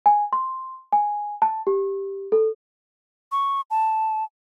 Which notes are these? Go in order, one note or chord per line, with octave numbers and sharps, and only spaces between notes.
G#5
C6
G#5
A5
G4
A4
C#6
A5